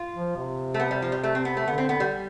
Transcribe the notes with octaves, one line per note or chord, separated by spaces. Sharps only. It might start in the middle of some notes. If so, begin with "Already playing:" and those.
Already playing: F4
F3
C3
A3
B3
G3
F3
G3
A3
C4
B3
A3
D3 B3
C4
B3
G3